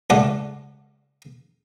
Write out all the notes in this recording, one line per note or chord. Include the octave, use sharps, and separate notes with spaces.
C#2 A2 A4 D5 F#5